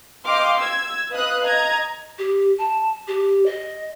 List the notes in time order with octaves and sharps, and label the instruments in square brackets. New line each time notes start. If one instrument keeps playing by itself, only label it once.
[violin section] D#5 F5 G5 C6 D6 F6
E6 G#6
B4 D#5 F5 D#6 F#6
D#5 A#5 G#6
[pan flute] G4
A5
G4
D#5